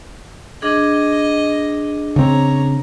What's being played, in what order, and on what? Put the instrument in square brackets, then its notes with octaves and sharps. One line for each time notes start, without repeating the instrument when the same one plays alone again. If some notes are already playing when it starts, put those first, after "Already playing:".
[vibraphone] D4 G#4 [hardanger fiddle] D#5
[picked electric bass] C#3 C4 [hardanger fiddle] C#5 A#5